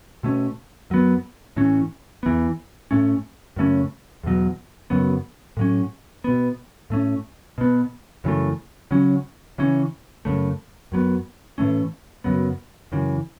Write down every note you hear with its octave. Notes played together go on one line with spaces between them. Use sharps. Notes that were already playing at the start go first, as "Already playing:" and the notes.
B2 A3 C#4
F#2 F#3 B3
A2 E3 C#4
E2 E3 B3
A2 A3 C#4
F#2 C#3 A3 C#4
E2 B2 F#3
F#2 C#3 F#3 B3
A2 F#3 C#4
B2 B3
A2 A3 C#4
B2 B3
F#2 C#3 E3 A3
C#3 F#3 C#4
C#3 E3 C#4
F#2 C#3 A3
F#2 F#3 B3
A2 E3 A3 C#4
F#2 C#3 F#3 B3
F#2 C#3 E3